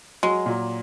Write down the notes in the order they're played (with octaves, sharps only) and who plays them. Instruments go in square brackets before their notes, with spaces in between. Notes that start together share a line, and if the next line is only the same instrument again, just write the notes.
[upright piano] F#3 [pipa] G#3
[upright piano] A#2